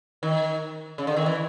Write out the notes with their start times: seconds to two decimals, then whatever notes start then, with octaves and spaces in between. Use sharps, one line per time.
0.23 D#3
0.98 C#3
1.07 D3
1.16 D#3
1.26 E3